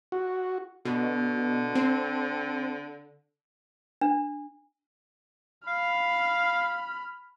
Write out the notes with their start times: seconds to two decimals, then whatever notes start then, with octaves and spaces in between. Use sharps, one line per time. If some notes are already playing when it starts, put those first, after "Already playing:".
0.12 F#4
0.85 B2 D3
1.75 C4
4.01 D4
5.68 F5 B5 F6